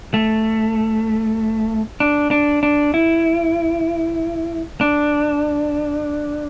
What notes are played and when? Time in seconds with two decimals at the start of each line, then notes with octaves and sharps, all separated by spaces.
0.14 A3
2.00 D4
2.31 D4
2.63 D4
2.94 E4
4.81 D4